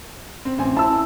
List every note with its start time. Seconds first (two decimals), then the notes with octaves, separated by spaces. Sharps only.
0.45 C4
0.58 A1 C4 G#5
0.77 E4 A5 E6